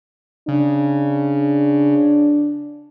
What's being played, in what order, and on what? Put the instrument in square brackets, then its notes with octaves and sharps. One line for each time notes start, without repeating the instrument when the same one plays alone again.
[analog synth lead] C#3 [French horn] D4